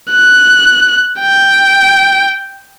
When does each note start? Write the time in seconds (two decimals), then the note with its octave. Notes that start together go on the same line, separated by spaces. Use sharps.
0.11 F#6
1.21 G5